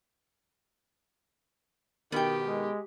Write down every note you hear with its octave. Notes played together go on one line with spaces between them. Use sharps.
B2 D#3 B3 G4 G5
G#3